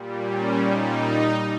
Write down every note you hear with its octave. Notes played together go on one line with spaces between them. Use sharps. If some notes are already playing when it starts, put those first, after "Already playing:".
Already playing: A#2 G3
C#4
D#4